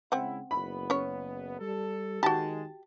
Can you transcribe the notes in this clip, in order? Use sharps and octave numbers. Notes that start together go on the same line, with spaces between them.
C#3 G#3 C4 E4 F#5
F#1 B3 B5
C#4 C#5
G3 A4
D#3 G#3 F#4 G4 A5